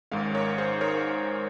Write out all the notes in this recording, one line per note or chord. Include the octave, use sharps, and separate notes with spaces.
G#1 G#2 D#3 G#3 C#4 C#5 F5
A#4 C#5
G#4 C5
A#4 C#5